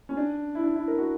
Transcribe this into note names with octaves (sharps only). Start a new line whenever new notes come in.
C#4
D4
E4
D4
E4
A#4
F#4